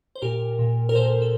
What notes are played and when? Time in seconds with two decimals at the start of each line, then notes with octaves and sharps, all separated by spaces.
0.15 C5
0.22 A#2 G4 A#4
0.59 A#2
0.89 A#4
0.95 A#2 A4 C5
1.22 A4